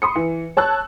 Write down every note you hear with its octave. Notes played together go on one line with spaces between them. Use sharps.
B5 C6 D#6 C#7
E3
C#5 A5 E6 F#6